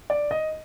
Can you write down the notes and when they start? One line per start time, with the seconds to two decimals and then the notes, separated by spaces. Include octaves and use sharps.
0.10 D5
0.31 D#5